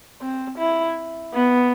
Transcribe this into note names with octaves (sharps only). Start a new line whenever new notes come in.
C4
E4
B3